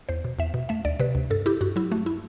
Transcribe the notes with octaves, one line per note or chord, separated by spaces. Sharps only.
E2 C5
B2
E2 E5
B2
A3 E5
D2 D5
C3 B4
D2
G2 A4
E4 G4
G2 F#4
F#3 E4
A3 F#4
E4